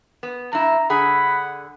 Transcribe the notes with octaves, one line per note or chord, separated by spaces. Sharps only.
B3
G2 E4 A#5
D3 G#4 F#5 B5